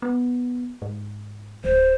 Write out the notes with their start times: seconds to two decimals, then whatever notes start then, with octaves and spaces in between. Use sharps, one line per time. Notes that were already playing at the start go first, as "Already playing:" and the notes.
0.02 B3
0.82 G#2
1.64 D1 C5